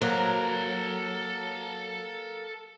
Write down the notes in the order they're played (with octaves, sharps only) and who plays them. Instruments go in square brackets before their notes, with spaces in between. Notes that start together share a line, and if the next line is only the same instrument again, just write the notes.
[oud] F#3 [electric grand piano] A#3 [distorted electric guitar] A4 A#5